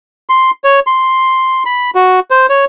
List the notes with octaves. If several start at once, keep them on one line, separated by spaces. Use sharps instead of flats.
C6
C#5
C6
B5
F#4
C5
C#5